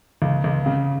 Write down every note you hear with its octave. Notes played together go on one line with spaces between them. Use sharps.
C#2
C#2
C#3